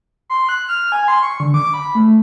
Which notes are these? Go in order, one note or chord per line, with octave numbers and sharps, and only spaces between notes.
C6
F#6
F6
G#5
C6
C#6
D3
D6
B5
A3